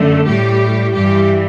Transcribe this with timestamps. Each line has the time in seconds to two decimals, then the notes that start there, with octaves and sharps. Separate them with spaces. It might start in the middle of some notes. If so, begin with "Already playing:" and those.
Already playing: F#2 D3 A3
0.26 A2 G3 G4
0.95 G2 E3 G3 G4